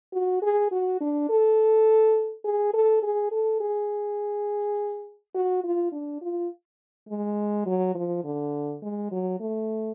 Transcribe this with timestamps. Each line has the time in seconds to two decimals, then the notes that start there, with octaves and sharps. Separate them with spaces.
0.13 F#4
0.43 G#4
0.72 F#4
1.01 D4
1.30 A4
2.45 G#4
2.74 A4
3.03 G#4
3.32 A4
3.61 G#4
5.35 F#4
5.64 F4
5.92 D4
6.22 F4
7.09 G#3
7.66 F#3
7.95 F3
8.24 D3
8.83 G#3
9.12 F#3
9.40 A3